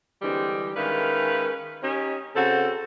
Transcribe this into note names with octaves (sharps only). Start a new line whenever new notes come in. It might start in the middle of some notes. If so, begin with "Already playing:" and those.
D3 E3 G3 G#3 C4 D4
D#3 G#3 C#4 B4 E5 F5
C#4 D#4 G4
C#3 C4 F#4 A4